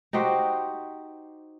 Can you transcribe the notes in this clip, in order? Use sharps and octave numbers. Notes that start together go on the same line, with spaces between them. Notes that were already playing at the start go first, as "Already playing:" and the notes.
D#4 F#4 G4 C5